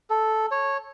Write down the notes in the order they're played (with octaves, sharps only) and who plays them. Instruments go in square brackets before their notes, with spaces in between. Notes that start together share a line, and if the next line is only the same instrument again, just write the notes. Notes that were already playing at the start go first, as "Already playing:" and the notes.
[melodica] A4
C#5